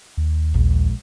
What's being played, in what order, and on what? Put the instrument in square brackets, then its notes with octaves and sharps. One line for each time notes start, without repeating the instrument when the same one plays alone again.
[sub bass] D#2
[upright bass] A#1 G#3